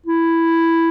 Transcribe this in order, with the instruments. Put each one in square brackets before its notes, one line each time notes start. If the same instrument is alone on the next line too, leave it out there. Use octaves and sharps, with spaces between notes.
[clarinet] E4